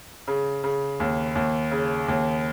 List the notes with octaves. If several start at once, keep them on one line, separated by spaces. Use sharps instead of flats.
C#3
C#3
D#2
D#2
C#3
D#2